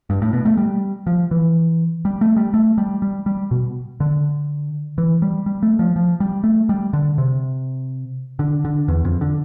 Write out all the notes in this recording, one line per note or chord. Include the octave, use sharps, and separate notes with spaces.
G2
A2
B2
A3
G3
F3
E3
G3
A3
G3
A3
G3
G3
G3
B2
D3
E3
G3
G3
A3
F3
F3
G3
A3
G3
D3
C3
D3
D3
E2
F2
D3